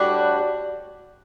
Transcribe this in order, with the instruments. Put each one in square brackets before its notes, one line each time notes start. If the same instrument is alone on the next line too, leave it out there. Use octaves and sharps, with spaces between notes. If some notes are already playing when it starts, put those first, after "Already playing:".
Already playing: [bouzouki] A2 G3 D4 F#4